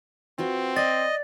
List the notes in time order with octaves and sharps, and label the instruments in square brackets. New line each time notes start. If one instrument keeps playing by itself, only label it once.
[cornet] C4 [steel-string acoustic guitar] F4 F#4 B4
[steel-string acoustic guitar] D5 [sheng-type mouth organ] D#5 [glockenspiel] A6